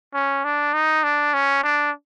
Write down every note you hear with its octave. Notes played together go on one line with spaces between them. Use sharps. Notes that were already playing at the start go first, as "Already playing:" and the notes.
C#4
D4
D#4
D4
C#4
D4